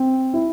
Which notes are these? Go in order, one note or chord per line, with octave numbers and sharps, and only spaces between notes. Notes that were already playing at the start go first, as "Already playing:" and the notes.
Already playing: C4
E4